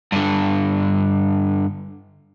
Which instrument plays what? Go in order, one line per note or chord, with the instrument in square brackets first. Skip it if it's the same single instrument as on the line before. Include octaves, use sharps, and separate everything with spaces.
[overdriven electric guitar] G2 D3